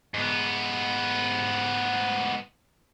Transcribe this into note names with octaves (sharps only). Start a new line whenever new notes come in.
G#2 B3